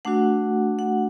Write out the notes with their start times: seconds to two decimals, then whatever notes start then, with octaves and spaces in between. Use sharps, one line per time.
0.05 A3 D4 F#4 F#5
0.79 F#5